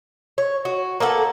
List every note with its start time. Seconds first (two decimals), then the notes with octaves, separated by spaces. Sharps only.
0.38 C#5
0.65 F#4
1.00 A#3 B3 A4 F#5